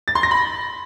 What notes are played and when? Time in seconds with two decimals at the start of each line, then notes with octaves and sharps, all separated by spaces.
0.08 A6
0.15 C6
0.23 A#6
0.31 B5